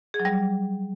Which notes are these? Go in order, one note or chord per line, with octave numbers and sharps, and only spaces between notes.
G#4
F#3
G3